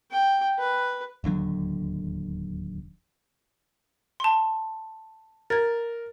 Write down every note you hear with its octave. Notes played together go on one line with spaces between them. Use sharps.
G5
B4
D1 D#2 D3 F#3
A5 C6
A#4 G#6 A6